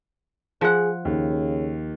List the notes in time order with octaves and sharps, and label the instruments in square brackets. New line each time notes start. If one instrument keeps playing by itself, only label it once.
[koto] F3 F#5 [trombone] G#4
[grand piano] D#2 [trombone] C#3